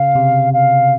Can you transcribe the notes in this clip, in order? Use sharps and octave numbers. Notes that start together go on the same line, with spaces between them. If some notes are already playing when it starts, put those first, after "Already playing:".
Already playing: C#3 F5
C3
F5